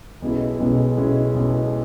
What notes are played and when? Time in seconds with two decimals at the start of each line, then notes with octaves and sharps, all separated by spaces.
0.22 B1 B2 G#3 C#4 E4
0.59 B1 B2 G#3 C#4 E4
0.97 B1 B2 G#3 C#4 E4
1.34 B1 B2 G#3 C#4 E4